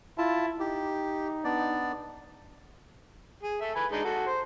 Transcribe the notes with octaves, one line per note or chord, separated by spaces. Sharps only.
E4 F4 A5
D#4 G4
B3 D4 D5
G#4
A4 E5
B4 G#5
G#3 D4 D#4
F#4 A4
C5